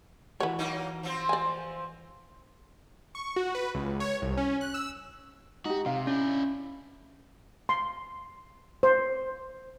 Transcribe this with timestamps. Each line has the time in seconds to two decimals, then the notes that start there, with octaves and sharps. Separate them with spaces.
0.40 E3 F#4 B4 C#5
0.59 F#3 A#3 D#4
1.03 F3 C4 C5
1.29 D5 G#5
3.15 C#6
3.36 F#4
3.55 B4
3.75 C#2
4.00 C#5
4.22 C2
4.37 C#4
4.61 F#6
4.74 E6
5.65 D#4 F#4 G4
5.86 C3 F5
6.07 C#4 D4 E4
7.69 C6
8.83 C5